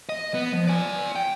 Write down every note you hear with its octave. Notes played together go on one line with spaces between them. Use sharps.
D#5
B3
F3
D5 G#5
G5